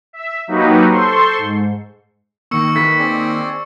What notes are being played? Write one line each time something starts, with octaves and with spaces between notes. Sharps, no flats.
E5
F#3 A#3 D#4 F#4 G4 B4
A4 C5 C6 C#6
G#2
D#3 A#3 C#6 E6 C#7
B4 B6
C4 G#4 D5